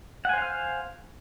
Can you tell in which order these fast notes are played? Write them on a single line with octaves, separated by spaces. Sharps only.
F#5 G#5 C5 F5 F6